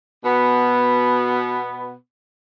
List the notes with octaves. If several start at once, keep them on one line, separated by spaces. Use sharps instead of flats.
B2 B3